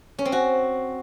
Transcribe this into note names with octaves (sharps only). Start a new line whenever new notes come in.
C#4
C4
F#4